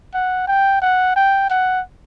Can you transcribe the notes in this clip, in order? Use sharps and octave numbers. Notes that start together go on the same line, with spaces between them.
F#5
G5
F#5
G5
F#5